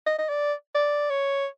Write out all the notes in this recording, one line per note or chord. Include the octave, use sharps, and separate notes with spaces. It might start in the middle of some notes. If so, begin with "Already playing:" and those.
D#5
D#5
D5
D5
C#5